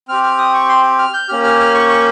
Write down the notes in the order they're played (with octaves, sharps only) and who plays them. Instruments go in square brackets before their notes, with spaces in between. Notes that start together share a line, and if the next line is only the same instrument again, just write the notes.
[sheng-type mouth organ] C4 G4 F6
F6
D#6
C#6
C6
F6
G6
A#3 C#4 G4 F6
F6
F6
C#6
C#6